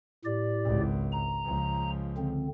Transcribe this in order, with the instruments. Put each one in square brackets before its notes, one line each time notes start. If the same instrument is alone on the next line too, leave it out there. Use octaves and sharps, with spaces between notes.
[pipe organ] A2 G4 D5
[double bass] G#1 C#2
[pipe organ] A#5
[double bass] C#2 F3
[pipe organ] D3 C4